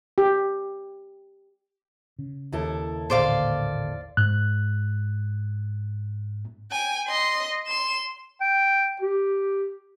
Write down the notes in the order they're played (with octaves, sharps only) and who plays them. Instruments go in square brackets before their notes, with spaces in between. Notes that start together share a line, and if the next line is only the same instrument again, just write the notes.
[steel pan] G4
[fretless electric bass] C#3
[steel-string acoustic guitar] D#2 E4 A4
[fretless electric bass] A1 A#2 D3 [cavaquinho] C5 D5 F5
[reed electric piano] G#2 F#6
[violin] G5 G#5
D#5 C6
C6 E7
[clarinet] G5
G4